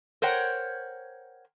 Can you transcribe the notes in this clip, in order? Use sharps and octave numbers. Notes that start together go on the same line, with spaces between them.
A#4 C5 C#5 F#5 G5